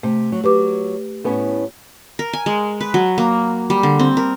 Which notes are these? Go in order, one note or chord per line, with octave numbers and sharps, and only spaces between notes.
C3 A3
F#3
F#3 G4 B4 D6
A2 B3 C#4
A#4
G#5
G#3
B4
F#3
A#3
G3
D3
C4
A#4